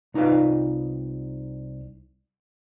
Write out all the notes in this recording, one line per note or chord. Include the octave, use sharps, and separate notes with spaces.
C2 D#4 F4 B4 F5